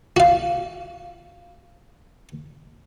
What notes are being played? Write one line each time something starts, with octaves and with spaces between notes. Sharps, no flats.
F#4 F5